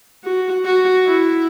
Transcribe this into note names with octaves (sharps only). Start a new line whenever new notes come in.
F#4
F#4
E4